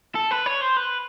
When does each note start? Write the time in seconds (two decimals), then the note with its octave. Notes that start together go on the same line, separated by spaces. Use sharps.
0.15 A4
0.31 B4
0.46 C#5
0.61 C5
0.77 B4